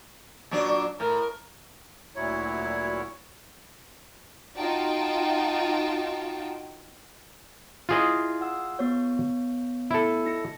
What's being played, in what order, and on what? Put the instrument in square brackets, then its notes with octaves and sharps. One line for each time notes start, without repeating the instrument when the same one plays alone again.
[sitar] A#2 F#3 D4
[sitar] A2 [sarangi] A#4
[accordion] D2 A#2 F#3 E4 C#5
[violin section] D#4 F4 F#4 G5 A5
[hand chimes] E4 [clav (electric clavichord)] F4 G#4 D#5
[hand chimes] F#5 E6
B3 C#5
[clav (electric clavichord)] E4 A4
[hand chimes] D#4 A#6 C#7